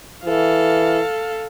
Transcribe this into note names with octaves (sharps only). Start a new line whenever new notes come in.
E3 A4 F5